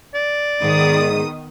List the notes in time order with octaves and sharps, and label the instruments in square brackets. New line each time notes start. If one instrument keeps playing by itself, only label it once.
[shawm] D5
[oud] G#2 G#3 [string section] D#3 B3 D#6